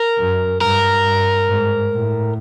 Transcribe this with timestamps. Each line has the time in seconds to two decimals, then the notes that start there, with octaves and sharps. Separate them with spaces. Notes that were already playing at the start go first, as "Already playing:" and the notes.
Already playing: A#4
0.18 F#2
0.61 G2 A#4
1.04 G2
1.47 G#2
1.91 A2